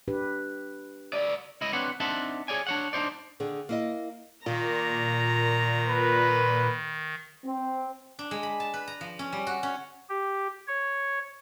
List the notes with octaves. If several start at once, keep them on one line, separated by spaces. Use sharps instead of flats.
D4 G4 B4
C#2 D5
C#2 E4 D#5
C4 D4 B4 C#5 F#5
C4 D4 D#4 E5 F#5 A5
G#4 C#5 D5 G#5
D4 C#5 F#5
D4 D#4 C5 D5
D3 D#3 G#4
A#3 E4 D#5
A#2 D#3 A#5
B4
C4
D4
G#3
B5
A5
B4
A#5
F3
C#4
G3
F#4
C#4
G4
C#5